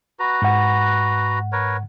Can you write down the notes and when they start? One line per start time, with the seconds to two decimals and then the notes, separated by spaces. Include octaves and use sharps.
0.19 F#4 B4 A#5
0.42 G#2 F#5
1.52 A#4 B4 C#5